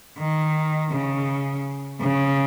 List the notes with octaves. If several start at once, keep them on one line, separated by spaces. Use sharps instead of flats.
D#3
C#3
C#3